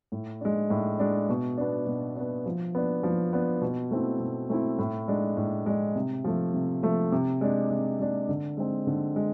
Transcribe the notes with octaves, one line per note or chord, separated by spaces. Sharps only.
A2
G#3 D4
A2
G#3 D4
B2
B3 D4
B2
B3 D4
F3
B3 D4
F3
B3 D4
B2
A3 C4 E4
B2
A3 C4 E4
A2
G#3 D4
A2
G#3 D4
C3
F3 A3
C3
F3 A3
C3
G#3 D4
C3
G#3 D4
D3
G#3 C4
D3
G#3